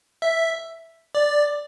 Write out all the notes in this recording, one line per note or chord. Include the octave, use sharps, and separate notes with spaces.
E5
D5